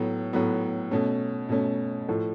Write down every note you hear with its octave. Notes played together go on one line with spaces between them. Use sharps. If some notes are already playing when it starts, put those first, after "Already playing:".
Already playing: A2 F#3 B3
A2 F#3 B3
B2 A3 C#4
B2 A3 C#4
A2 F3 A3